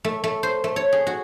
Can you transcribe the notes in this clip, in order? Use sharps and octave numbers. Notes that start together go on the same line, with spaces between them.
A3
A3
C5
A3
C#5
G#4
F#4